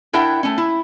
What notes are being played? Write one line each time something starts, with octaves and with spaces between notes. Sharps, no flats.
D4 E4 A#4 E5 F#5 G5
A3 C#4
E4